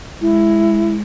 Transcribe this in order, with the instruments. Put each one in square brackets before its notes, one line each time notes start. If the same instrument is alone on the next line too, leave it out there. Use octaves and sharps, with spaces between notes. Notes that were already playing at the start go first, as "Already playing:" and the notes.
[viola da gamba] G#3 [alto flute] E4